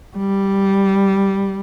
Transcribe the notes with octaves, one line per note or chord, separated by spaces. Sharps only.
G3